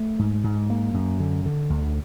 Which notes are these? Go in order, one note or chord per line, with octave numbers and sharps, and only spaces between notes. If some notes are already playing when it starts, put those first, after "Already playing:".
Already playing: A3
G#2
G#2
A#3
F#2
D3
D3
D2